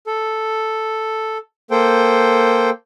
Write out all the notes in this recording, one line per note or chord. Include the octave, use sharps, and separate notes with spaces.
A4
A#3 A4 C5 G5